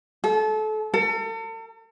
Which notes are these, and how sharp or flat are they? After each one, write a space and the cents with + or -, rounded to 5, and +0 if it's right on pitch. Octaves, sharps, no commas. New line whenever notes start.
A4 -30
A4 +40